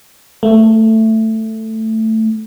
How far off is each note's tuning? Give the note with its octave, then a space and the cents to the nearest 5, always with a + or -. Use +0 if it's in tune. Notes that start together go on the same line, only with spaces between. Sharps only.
A3 +10